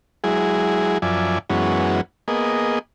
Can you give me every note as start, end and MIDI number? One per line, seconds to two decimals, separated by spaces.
0.24 0.98 54
0.24 0.98 56
0.24 0.98 64
0.24 0.98 68
1.02 1.38 42
1.02 1.38 53
1.02 1.38 74
1.02 1.38 76
1.02 1.38 80
1.50 2.01 42
1.50 2.01 52
1.50 2.01 56
1.50 2.01 59
1.50 2.01 61
1.50 2.01 66
2.28 2.79 58
2.28 2.79 59
2.28 2.79 68
2.28 2.79 75